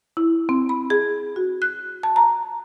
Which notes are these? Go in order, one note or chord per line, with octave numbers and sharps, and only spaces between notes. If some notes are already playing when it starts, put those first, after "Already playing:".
E4
C4
B5
G#4
F#4
F#6
A5
A#5